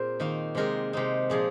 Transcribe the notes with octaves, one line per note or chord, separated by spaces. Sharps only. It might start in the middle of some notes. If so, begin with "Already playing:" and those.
Already playing: A#2 C4 G#4 A#4 C5
D#3 A#3 D#4
C3 G#3 C4 D#4 A#4
C3 G#3 C4 D#4
A#2 F3 A#3 G#4